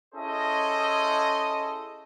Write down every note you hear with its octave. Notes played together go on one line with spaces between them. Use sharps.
C#4 E4 G#4 A4 C5 D#5